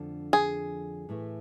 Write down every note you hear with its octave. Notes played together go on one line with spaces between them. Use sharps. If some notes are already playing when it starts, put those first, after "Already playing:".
Already playing: F2 D3 F3 A3 D4
G#4
A2 E3 A3